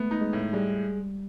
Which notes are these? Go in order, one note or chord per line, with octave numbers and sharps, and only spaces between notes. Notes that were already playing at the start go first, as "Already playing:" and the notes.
Already playing: G#3 A3 B3
D#4
G#3
A2
G3 G#3